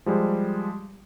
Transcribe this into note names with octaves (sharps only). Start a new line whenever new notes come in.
F3 G3 G#3